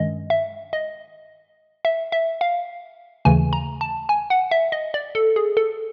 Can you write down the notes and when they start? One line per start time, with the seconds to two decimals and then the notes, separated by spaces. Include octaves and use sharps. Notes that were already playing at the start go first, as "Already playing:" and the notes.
Already playing: G2 D#3 G#3 C#4 D#5
0.30 E5
0.73 D#5
1.85 E5
2.12 E5
2.41 F5
3.25 D#2 C#3 E3 A3 G#5
3.53 A#5
3.81 A5
4.09 G#5
4.30 F#5
4.51 E5
4.72 D#5
4.94 D5
5.15 A4
5.36 G#4
5.57 A4